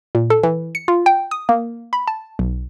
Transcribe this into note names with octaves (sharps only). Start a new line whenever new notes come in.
A#2
A4
E3
C#7
F4
G5
D#6
A#3
B5
A5
B1